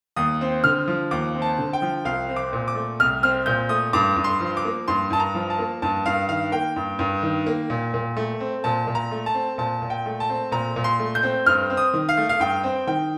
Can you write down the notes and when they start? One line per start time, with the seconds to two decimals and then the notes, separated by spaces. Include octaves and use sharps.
0.16 D#2 D#6
0.41 C4
0.64 D3 F6
0.88 F3
1.11 D#2 D6
1.35 C4
1.42 A5
1.59 D3
1.73 G5
1.82 F3
2.05 C2 F5
2.29 C4
2.36 D6
2.53 A#2
2.68 D6
2.75 A3
3.00 C2 F6
3.23 C4 F6
3.46 A#2 G6
3.69 A3 D#6
3.93 G2 D6
4.17 G2
4.24 C6
4.41 F3
4.57 D6
4.65 A#3
4.88 G2 C6
5.10 G2 A5
5.20 A#5
5.35 F3
5.50 A5
5.59 A#3
5.82 G2 A5
6.06 G2 F5
6.29 D#3 F5
6.52 A#3 G5
6.76 G2
6.99 G2
7.23 D#3
7.46 A#3
7.70 A#2
7.94 A#2
8.16 A3
8.40 C4
8.64 A#2 A5
8.87 A#2
8.95 A#5
9.11 A3
9.26 A5
9.34 C4
9.58 A#2 A5
9.82 A#2
9.90 G5
10.06 A3
10.20 A5
10.29 C4
10.52 A#2 A#5
10.76 A#2
10.84 C6
10.99 A3
11.15 G6
11.23 C4
11.46 G2 F6
11.70 C4
11.77 D#6
11.94 D#3
12.09 F5
12.17 A3
12.29 F5
12.40 G2 G5
12.63 C4
12.87 D#3 G5